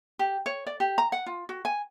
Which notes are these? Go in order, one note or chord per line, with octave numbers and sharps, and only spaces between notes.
G4
C#5
D5
G4
A#5
F#5
F4
F#4
G#5